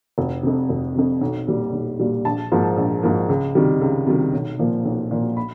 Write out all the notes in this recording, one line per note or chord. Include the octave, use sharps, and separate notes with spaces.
F1
F2 C3
F1
F2 C3
B1
A#2 G3
B1
A#2 G3
A#1 A5
G#2 F3 A#3
A#1
G#2 F3 A#3
C#2
C3 D#3 G3
C#2
C3 D#3 G3
B1
A#2 F3 A#3
B1
A#2 F3 A#3
B5